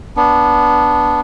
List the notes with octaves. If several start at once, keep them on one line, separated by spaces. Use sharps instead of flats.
B3 D4